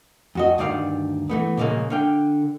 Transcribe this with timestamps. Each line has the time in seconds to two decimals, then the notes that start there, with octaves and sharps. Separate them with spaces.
0.35 F2 F#4 D#5
0.58 D2 G2 D#3 D5 F5
1.29 E3 A3 B3
1.57 A#2 C#3 F3 G#3 A#3
1.90 D3 F5 G5